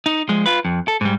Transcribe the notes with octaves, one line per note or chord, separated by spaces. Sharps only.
D#4
F3 G#3
F4 B4
F2
A4
G#2 G3